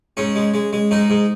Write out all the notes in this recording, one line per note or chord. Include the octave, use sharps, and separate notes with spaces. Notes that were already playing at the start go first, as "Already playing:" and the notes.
G#2 C#4
G#3
G#3
G#3
G#2 D#4
G#2